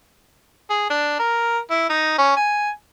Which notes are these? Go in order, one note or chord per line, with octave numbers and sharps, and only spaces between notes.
G#4
D4
A#4
E4
D#4
C#4
G#5